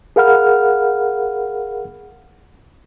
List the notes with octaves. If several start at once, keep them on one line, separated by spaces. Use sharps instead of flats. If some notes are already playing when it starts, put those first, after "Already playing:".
G#4 A#4 F5 F#5 B5 F6